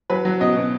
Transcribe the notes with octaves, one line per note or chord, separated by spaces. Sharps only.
F#3 B4
F#3
B2 D#5
B2